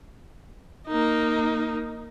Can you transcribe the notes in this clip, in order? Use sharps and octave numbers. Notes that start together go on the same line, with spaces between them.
A#3 D#4